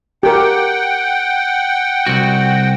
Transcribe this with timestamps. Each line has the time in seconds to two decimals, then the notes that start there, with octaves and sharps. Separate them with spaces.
0.23 G4 A#4 F#5 G5
2.07 C2 F#4